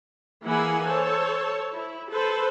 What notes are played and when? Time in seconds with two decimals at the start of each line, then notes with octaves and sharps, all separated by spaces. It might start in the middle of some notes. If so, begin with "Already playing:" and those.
0.45 E3 A#3 E4 G#4 F#5 G#5
0.86 A4 C5 C#5
1.73 E4
2.11 A4 B4 C5